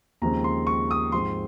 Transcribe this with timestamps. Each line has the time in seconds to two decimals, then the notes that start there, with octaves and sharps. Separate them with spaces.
0.22 D#2 C#3 F3 G#3 C4 A#5
0.44 C6
0.67 C#6
0.91 D#6
1.12 G#2 F3 G#3 C4 C6